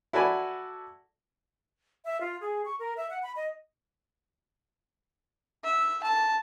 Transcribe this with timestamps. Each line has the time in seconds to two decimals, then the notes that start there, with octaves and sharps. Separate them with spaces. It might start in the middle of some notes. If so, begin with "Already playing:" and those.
0.13 E4 F#4 A4 D5 G#5 B5
2.06 E5
2.21 F4
2.41 G#4
2.64 C#6
2.79 A#4
2.96 E5
3.10 F#5
3.22 B5
3.36 D#5
5.64 E5
6.03 A5